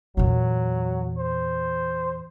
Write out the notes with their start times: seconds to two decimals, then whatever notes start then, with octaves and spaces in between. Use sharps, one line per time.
0.17 E2 A#2 F#3
1.18 C5